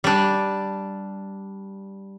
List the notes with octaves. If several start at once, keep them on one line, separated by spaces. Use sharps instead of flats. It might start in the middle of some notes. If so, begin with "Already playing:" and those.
G3 D4